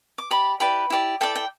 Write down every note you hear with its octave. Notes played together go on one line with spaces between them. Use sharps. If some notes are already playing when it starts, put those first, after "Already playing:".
D6
G4 D5 B5
E4 G4 B4 D5 B5
E4 G4 D5
E4 A4 D5 G5
G5